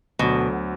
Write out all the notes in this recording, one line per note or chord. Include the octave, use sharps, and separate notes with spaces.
D2 B2 D3 F#3